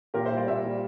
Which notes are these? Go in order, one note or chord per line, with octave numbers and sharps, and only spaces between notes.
A#2 G4 A#4
C5 E5
G3
D5 F5
A#2 C5 E5
G3